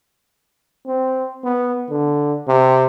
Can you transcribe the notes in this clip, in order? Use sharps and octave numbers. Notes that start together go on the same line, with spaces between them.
C4
B3
D3
C3